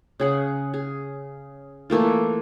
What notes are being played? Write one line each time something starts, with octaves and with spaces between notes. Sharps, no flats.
C#3 G#4 F#5
G#4
E3 A3 A#3 F4